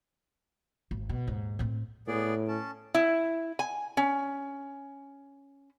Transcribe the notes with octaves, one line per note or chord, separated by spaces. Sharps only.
G#1
B2
D#2 G#2
A2 C4
A2 B3 G#4 D5
C#4 A5
E4
G#5
C#4